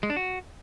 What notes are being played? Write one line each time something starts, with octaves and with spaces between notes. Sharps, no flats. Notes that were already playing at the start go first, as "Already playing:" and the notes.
G#3
D4
F#4